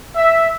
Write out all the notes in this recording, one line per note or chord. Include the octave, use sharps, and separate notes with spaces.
E5